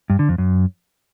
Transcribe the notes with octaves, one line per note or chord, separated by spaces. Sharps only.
G2
D3
F2
F#2